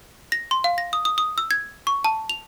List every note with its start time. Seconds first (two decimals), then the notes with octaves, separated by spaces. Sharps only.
0.32 A#6
0.51 C6
0.64 F5
0.78 A#6
0.93 D#6
1.05 D#6
1.18 D#6
1.38 E6
1.51 G#6
1.87 C#6
2.05 A5
2.29 F7